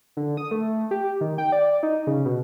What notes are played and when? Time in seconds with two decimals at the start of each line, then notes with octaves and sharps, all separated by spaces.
0.17 D3
0.37 D#6
0.51 A3
0.91 G4
1.21 D#3
1.38 G5
1.52 D5
1.83 D#4
2.07 C#3
2.25 B2